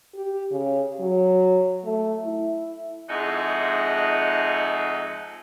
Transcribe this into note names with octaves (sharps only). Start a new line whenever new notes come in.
G4
C#3
F#3
A3
E4
F2 G#2 G#3 D#4 E5 F#5